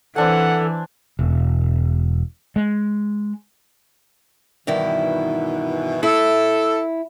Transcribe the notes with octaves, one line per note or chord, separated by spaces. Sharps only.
E3 C4 D4 A4 F#5 G#5
E1
G#3
G2 B2 D#3 E3 E4
E4 A4